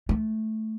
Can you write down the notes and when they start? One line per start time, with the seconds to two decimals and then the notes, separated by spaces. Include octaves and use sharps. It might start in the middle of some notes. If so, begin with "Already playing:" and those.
0.09 A3